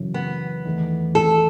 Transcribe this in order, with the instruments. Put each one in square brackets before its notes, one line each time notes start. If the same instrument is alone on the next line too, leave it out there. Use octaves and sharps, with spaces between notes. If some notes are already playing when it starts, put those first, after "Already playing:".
Already playing: [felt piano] F#2 C#3 E3
[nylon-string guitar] B3
[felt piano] E2 D#3 A3
[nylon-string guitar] A4